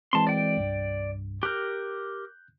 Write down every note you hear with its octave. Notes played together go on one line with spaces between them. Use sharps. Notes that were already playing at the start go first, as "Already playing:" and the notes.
E3 G#3 C4 A5 C6
D5 G5
C2 G2
G4 A#4 F#6 G6